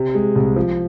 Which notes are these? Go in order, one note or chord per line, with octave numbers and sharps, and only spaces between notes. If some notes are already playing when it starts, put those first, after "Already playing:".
Already playing: C3
G#3
C2
F3